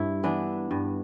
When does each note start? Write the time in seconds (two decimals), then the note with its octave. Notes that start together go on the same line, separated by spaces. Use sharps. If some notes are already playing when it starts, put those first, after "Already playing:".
Already playing: G2 E4
0.24 E3 B3 D4
0.71 G2